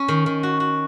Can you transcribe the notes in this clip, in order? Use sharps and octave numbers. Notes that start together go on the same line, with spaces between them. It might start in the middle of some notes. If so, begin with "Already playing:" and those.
Already playing: C#4
D#3
D#3
F#4
F#4